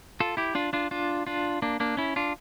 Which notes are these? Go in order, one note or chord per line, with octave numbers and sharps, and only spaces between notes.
F4 A4
E4 G4
D4 F4
D4 F4
D4 F4
D4 F4
A#3 D4
A#3 D4
C#4 E4
D4 F4